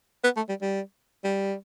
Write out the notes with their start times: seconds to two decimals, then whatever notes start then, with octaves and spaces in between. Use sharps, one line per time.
0.24 B3
0.37 A3
0.49 G3
0.62 G3
1.24 G3